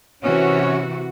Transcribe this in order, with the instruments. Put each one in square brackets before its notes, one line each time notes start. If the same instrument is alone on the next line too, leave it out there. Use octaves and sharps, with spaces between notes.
[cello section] C3 E3 F#4 [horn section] C#4